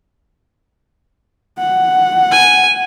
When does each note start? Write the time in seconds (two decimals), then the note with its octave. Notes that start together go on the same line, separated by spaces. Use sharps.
1.59 F#5
2.31 G#5